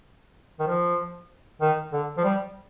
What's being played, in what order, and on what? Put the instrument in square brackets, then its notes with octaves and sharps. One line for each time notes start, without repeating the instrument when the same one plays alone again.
[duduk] D#3
F3
D#3
D3
F3
G3